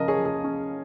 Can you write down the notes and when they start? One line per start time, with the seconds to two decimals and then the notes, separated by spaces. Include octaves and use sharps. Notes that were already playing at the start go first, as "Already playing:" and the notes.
Already playing: C#3 F3 C#4 A#4 D#5
0.08 G#4 C#5
0.17 F3
0.25 G#4
0.44 C#4